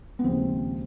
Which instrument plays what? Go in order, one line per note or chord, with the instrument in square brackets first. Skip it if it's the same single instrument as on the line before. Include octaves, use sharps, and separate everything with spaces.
[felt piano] B3
D#2 C#3 F3 G#3 C4